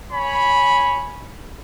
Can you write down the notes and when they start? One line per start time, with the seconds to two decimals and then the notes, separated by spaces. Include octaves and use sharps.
0.11 C#5 G#5 B5